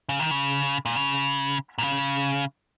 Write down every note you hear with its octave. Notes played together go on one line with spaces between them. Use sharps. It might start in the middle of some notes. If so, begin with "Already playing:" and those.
C#3
D#3
C#3
A#2
C#3
A#2
C#3